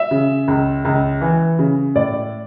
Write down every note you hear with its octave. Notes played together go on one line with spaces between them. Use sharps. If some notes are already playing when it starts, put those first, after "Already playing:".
Already playing: E5
C#3
C#2
C#2
E3
C#3
A2 D5